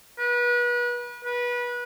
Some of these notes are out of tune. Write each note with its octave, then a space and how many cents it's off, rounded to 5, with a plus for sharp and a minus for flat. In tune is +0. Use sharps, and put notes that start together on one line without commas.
B4 -30
B4 -25